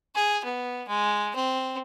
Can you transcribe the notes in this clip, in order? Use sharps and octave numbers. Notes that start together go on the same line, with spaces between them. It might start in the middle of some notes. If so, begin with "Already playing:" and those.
G#4
B3
G#3
C4